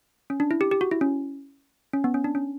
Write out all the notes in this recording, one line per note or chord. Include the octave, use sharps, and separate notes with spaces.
C#4
D4
E4
G4
G4
F#4
E4
C#4
C#4
B3
C#4
D4
C#4